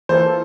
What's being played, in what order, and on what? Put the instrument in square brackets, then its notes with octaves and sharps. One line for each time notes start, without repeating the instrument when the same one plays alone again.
[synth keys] E3 A#3 F4 A4 [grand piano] C5